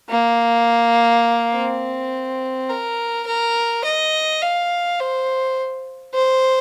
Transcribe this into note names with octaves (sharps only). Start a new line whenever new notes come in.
A#3
C4
A#4
A#4
D#5
F5
C5
C5